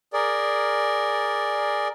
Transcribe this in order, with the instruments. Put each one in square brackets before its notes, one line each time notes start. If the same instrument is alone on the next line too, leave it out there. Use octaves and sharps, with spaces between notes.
[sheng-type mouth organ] G#4 A#4 D5